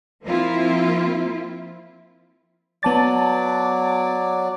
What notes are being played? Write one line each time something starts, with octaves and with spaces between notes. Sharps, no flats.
F3 A#3 C4 E4 F4
F#3 B3 D5 A5 A6